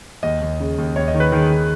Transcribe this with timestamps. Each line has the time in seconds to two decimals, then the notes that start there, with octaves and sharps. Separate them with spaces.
0.23 D#2 D#5
0.41 D#2
0.60 C#3
0.78 D#2
0.96 D#2 C#5
1.08 D#5
1.14 D#3
1.20 B4
1.32 D#3 G#4
1.50 D#3